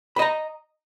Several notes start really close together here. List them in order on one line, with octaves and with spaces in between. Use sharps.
B5 D#5 A#5